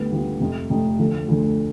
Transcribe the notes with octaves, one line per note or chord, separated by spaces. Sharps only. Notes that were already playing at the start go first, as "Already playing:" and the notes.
Already playing: D2 D3 G3 B3
D2 D3 G3 B3 F4
F1 F2 C3
F1 F2 C3
D2 D3 F3
D2 D3 F3